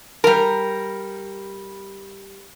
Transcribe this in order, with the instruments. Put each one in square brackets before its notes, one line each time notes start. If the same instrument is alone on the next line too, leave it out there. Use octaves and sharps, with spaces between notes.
[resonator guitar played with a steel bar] G3 A#4